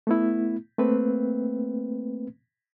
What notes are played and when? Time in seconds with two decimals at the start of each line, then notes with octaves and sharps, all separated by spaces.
0.07 A3 B3 E4
0.78 A3 A#3 C4 B4